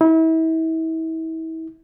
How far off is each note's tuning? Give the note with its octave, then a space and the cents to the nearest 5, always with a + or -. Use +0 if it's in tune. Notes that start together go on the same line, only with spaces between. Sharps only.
E4 -35